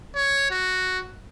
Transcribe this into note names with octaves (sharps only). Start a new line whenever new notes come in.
C#5
F#4